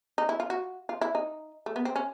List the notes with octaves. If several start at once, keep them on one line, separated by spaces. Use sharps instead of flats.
D#4
E4
F4
F#4
F4
E4
D#4
A3
B3
C4
C#4